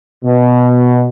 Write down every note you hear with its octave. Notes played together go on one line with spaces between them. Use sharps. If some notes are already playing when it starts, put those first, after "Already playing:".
B2